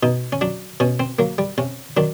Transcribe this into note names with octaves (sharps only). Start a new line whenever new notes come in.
B2 D#4
C#4
F#3 D4
B2 C#4
C4
F#3 A#3
G3
C3 C#4
D#3 F#3 D4